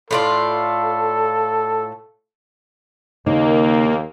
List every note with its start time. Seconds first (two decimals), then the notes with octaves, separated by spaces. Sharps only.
0.11 A2 F4 A4 D5
3.26 D#2 C#3 A#3 D#4 D#5